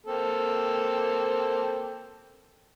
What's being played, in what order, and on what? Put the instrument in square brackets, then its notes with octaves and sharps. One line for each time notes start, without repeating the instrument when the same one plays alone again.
[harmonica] A#3 C4 A4